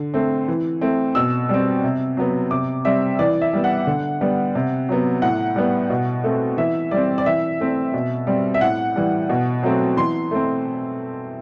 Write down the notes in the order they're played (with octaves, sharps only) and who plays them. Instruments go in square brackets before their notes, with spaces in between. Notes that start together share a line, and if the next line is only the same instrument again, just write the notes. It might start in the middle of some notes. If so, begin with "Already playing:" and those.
Already playing: [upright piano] D3
A3 C4
E3
A3 C4
B2 E6
G3 C4
C3
F#3 B3
C3 D6
G3 C4 E5
E3 D5
E5
G3 B3
F#5
D3
G3 B3
C3
F#3 B3
A2 F#5
G3 B3
B2
A3 C4
E3 E5
G3 C4 D5
D5
E3 E5
A3 C4
B2
G3 C4
E5
A2 F#5
E3 G3
B2
F#3 A3 C4
E3 C6
A3 C4